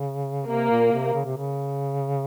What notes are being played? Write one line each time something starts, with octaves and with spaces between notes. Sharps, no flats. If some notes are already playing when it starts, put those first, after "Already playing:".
Already playing: C#3
C3 A#3
A#2
C3
C#3
C3
C#3